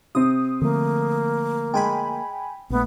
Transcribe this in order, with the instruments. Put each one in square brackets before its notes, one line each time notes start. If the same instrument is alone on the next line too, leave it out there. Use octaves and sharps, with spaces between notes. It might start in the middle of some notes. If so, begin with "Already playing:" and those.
[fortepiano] C3 C4 [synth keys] D#6
[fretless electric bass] D3 F3 A3 [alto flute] A#3
[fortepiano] G#3 [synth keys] G5 G#5 B5
[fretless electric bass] A#1 A3 [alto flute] B3